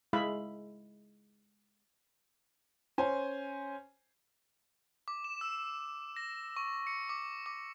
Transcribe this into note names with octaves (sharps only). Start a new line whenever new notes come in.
G#3 E4 G#4 E5 F5 B5
C#4 C5 G#5
D6
E7
E6
A#6
C#6
C#7
D6
D6